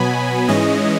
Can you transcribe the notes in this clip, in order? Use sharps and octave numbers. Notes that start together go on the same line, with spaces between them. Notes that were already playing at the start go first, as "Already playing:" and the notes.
Already playing: B2 F#3 B3 G#5 B5
G#2 E3 G#3 C#4 D#5